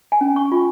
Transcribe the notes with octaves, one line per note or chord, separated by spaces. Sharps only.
G#5
C#4
C#6
F4